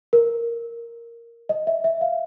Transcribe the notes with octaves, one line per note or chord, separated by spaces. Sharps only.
A#4
D#5
E5
E5
F5